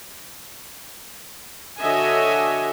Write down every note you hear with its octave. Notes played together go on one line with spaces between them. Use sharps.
D3 F#4 C#5 D#5 E5 G#5